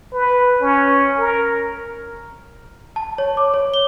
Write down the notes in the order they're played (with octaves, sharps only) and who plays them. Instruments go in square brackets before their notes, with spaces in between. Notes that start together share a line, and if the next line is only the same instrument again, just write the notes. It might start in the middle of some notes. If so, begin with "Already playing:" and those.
[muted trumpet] B4
C#4
A#4
[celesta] A5
C#5
D6
C#5
G7